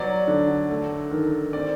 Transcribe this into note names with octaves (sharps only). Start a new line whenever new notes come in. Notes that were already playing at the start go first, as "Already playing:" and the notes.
Already playing: F#3 B3 D5
D3
A3
D#3
C4 D5